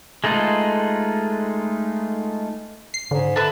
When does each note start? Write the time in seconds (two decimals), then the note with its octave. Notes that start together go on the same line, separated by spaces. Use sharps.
0.24 G#3 A3 D#4 F4 B4
2.94 C7
3.11 G#2 D3
3.36 D3 B4 E5 A5